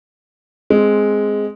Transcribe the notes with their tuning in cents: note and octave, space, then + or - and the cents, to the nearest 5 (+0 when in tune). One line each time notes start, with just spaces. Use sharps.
G#3 +0 C4 +0